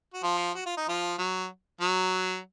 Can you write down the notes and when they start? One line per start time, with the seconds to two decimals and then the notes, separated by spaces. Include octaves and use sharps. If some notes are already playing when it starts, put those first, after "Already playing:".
0.14 F#4
0.23 F3 F4
0.55 F#4
0.66 F4
0.77 D#4
0.88 F3 F4
1.18 F#3
1.81 F#3